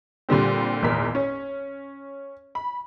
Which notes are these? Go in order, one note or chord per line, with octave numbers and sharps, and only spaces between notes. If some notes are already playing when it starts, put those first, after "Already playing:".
A#2 D3 G3 C4
G#1 E2 A#2 A#4 B6
C#4
B5